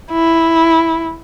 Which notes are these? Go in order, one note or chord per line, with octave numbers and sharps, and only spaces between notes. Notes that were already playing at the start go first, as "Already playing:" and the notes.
E4